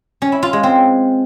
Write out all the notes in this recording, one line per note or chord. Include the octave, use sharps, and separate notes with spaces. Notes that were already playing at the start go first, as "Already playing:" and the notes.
C#4
E4
F4
G#3
C4